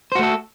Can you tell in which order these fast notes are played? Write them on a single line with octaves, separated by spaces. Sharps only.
C5 F#4 A3 A4